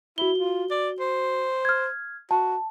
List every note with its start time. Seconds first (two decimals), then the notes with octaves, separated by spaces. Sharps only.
0.18 E4 F#4 G7
0.38 F4
0.71 D5
1.00 C5
1.65 F6 G#6
2.31 F#4 A5